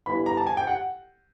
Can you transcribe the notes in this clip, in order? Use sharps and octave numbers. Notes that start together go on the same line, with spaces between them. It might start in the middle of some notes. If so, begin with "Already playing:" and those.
G1 G2 E3 B5
A#5
A5
G#5
G5
F#5